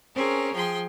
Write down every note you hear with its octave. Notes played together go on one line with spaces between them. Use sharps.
C4 C#4 G#4 A#4
F3 G#4 G5 C6